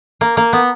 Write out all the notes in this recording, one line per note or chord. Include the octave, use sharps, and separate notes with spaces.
A#3
A#3
B3